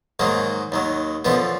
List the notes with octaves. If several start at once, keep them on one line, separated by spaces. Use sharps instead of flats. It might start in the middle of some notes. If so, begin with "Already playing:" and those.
G#2 D#3 F#3 A#3
D#2 D#3 F#3
F#2 B2 D3 F3 B3